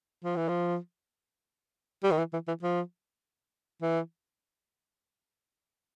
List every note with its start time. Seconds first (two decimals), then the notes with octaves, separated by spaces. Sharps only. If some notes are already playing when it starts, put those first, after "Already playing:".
0.24 F3
0.36 E3
0.49 F3
2.04 G3
2.11 D#3
2.18 E3
2.33 E3
2.48 E3
2.63 F3
3.82 E3